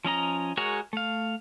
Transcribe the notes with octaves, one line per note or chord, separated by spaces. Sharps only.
F3 C#4 D#5 A#5
G#3 F#4 G#4 A#4 C#5
A3 F5